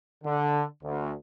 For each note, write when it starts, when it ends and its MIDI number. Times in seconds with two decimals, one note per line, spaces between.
0.24 0.64 50
0.83 1.13 38